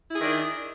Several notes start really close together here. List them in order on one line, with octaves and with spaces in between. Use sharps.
E4 G#4 D#3 D4